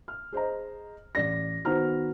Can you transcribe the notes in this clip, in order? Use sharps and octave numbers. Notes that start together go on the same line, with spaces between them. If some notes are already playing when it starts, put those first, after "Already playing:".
F6
G#4 C5 D#5 A#5
A1 D5 A#6
D#3 B3 F#4 C5 A#5 F6